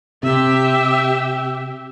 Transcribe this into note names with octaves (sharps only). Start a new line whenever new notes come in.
C3 G4 E5